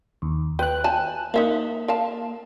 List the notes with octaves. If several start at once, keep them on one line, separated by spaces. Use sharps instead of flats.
D#2
B4 G5 F#6
G#5 A5
A#3 D#4 E5 F5
A#4 F5 A5